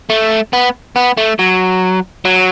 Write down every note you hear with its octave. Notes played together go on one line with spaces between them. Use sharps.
A3
B3
B3
A3
F#3
F#3